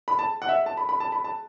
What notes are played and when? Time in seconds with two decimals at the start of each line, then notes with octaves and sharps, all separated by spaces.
0.08 B5
0.19 A5
0.42 F#5
0.49 E5
0.66 A5
0.77 B5
0.89 B5
1.00 A5
1.12 B5
1.24 A5